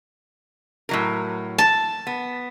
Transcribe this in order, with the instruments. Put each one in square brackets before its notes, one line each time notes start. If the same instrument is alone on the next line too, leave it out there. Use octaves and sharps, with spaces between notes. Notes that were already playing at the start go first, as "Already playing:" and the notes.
[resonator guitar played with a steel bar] A2 F#3 A#4
[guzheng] A5
[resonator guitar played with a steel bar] B3